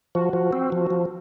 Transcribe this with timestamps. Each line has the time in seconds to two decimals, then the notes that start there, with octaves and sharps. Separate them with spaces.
0.15 F3 F#4
0.33 F3
0.53 C4
0.72 F3
0.91 F3